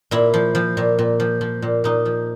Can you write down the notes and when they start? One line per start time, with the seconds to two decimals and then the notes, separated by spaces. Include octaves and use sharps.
0.11 A#2 E4
0.34 F3
0.55 F3
0.77 A#2
0.99 A#2
1.20 F3
1.41 F3
1.62 A#2
1.84 A#2 D#4
2.05 F3